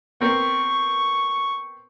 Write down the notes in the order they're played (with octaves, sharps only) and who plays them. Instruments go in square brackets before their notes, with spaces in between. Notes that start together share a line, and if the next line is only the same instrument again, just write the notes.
[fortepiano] B3 C4 A#4 [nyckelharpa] C#6